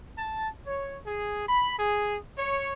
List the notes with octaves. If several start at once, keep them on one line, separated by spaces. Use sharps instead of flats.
A5
C#5
G#4
B5
G#4
C#5